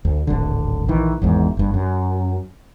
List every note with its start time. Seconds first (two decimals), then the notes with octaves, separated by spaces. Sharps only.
0.05 D2
0.27 D1 G#1 D3
0.88 A#1 D#3 E3
1.22 G#1 E2 G#2
1.57 G1 G2
1.74 F#2